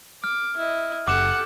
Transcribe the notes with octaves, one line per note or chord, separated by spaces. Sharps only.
D6 F6
E4 D#5
F#1 G4 A4 F#5 D6 E7